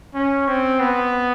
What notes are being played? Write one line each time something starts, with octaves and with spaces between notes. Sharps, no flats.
C#4
C4
B3